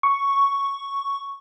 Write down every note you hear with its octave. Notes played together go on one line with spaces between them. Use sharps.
C#6